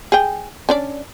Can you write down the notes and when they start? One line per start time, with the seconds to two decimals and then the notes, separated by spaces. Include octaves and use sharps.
0.12 G#4 G5
0.69 C#4 D4 D5